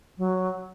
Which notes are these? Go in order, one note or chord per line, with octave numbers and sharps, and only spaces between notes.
F#3